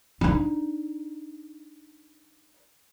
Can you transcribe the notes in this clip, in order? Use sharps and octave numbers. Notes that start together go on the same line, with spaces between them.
D4 D#4